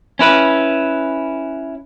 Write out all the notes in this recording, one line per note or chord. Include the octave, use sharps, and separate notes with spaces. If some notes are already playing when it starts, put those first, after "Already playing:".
C#4 E4 B4